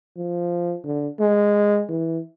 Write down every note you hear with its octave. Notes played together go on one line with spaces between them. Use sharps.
F3
D3
G#3
E3